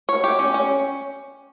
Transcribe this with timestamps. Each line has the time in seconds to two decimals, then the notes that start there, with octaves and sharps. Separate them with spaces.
0.09 C#5
0.24 G4
0.39 C#4
0.54 C#4